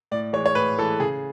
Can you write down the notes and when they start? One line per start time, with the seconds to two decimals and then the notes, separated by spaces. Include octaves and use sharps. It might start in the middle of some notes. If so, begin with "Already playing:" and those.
0.11 A2 D5
0.33 E3 G#3 C#5
0.46 C#5
0.55 A2 B4
0.78 E3 G#3 A4
1.00 C#3 G#4